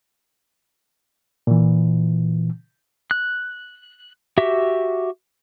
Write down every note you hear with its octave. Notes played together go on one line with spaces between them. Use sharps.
A#2 E3
F#6
F#4 G4 E5